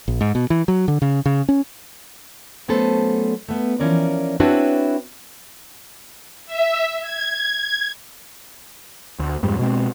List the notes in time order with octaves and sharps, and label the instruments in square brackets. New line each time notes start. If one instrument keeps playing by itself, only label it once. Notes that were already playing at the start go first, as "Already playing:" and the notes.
[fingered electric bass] A#1
G#2
B2
E3
F#3
D3
C#3
C#3
C#4
[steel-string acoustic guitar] F#3 A3 B3 C#4 A4 C5
A3 B3
E3 F3 C#4 A#4 D5
C4 D4 E4 F#4 B4 C#5
[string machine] E5
G#6
[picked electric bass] D2
F2 G#2 G3
B2 G#3 C4